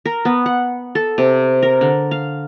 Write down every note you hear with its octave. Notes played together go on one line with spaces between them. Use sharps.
A#4
B3
F#5
A4
C3
A#4
D3
F5